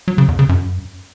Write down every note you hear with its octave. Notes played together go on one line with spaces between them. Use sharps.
F#3
C#3
E2
C#3
F#2